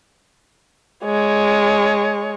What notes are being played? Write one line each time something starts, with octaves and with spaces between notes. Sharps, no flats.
G#3 C#5